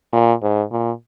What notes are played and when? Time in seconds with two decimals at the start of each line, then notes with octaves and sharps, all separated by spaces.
0.13 A#2
0.42 G#2
0.71 A#2